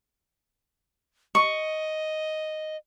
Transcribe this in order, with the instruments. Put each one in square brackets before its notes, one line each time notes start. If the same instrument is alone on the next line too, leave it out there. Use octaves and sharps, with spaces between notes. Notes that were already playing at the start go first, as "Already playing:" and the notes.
[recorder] D#5 [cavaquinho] C#6